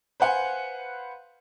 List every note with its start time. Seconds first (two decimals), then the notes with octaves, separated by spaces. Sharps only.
0.20 B4 C5 F5 F#5 G#5